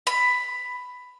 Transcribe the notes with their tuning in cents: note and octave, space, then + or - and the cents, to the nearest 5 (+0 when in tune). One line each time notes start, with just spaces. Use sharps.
B5 +10